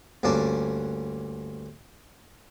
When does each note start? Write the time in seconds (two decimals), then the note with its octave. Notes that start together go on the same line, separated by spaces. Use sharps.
0.23 D2 G2 A#3 C#4 D5 A5